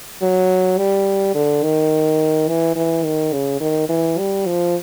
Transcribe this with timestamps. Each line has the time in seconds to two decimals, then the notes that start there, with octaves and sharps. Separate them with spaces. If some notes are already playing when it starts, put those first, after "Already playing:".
0.22 F#3
0.78 G3
1.35 D3
1.63 D#3
2.48 E3
2.76 E3
3.04 D#3
3.32 C#3
3.60 D#3
3.89 E3
4.18 G3
4.46 F3